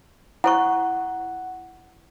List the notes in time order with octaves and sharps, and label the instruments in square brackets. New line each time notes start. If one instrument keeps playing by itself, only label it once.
[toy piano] E4 C5 C#6 [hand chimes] F#5